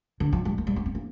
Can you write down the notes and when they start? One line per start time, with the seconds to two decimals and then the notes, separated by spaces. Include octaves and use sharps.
0.20 D3
0.33 F3
0.45 G3
0.58 A#3
0.67 G3
0.76 A#3
0.86 C4
0.95 A#3